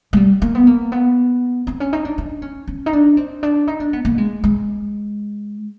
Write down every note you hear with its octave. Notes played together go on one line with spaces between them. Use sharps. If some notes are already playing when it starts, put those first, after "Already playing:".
G#3
G3
A#3
B3
A#3
B3
C4
C#4
D#4
D4
D4
C#4
C#4
D#4
D4
C4
D4
D#4
D4
B3
A#3
G#3
G#3